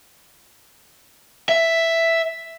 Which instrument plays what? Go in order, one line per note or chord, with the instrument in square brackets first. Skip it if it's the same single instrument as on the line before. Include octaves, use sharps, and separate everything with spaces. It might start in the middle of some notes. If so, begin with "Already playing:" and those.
[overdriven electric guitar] E5